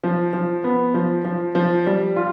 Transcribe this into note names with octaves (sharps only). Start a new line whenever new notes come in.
F3
F3
B3
F3
F3
F3
G3
F4